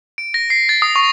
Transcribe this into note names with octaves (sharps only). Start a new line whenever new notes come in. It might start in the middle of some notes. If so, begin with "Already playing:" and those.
D7
A#6
C7
A6
D#6
C#6